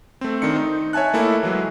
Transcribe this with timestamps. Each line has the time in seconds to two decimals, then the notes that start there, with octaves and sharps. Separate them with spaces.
0.21 A3 C4
0.42 D#3 C4 D4 C#7
0.56 D#4
0.93 C#5 E5 G#5 A5 F#6
1.14 A3 A#3 E4 A4 D#5
1.43 E3 F#3 G#3